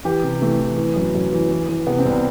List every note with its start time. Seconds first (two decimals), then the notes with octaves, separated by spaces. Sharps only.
0.05 E3 G4
0.23 C3
0.42 E3 A3
0.60 E3
0.78 E3
0.96 F#2
1.15 F#2
1.32 E3
1.51 E3
1.69 E3
1.86 C3 B3
1.99 C4
2.05 C2